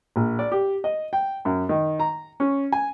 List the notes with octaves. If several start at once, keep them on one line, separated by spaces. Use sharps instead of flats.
A#1
D5
G4
D#5
G5
F#2
D#3
A#5
C#4
G#5